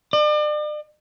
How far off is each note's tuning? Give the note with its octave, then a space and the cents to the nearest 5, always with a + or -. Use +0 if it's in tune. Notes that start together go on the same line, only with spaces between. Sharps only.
D5 +40